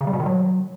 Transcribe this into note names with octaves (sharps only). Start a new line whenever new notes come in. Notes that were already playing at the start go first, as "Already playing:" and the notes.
C#3
G3
B2
D#3
F#3